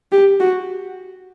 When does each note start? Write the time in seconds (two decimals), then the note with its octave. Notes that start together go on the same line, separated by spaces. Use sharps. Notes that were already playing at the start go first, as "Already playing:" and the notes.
0.12 G4
0.40 F#4